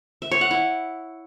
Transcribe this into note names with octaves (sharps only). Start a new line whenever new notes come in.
E5
C#5
F#5
E4